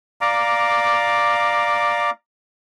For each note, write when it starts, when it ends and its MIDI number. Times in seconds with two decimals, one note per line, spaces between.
0.21 2.10 74
0.21 2.10 77
0.21 2.10 82
0.21 2.10 86